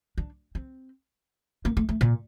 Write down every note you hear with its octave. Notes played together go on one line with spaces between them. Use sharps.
D4
C4
A#3
A3
A3
A#2